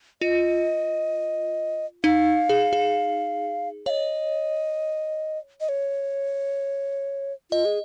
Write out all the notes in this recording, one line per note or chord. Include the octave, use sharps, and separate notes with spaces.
F4 D#5
D#4 F5
G#4
G#4
C#5 D#5 F5
D#5
C#5
F4 D#5
G#4